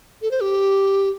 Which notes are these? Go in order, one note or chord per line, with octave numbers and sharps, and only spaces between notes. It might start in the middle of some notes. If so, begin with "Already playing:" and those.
A4
C5
G4